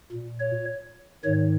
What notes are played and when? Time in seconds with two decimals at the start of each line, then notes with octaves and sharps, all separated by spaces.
0.12 A#2
0.40 C#5
1.24 G#2 D#3 C#5